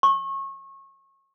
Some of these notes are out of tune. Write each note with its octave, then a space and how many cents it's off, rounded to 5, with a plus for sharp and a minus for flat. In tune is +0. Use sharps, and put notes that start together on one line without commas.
C#6 -30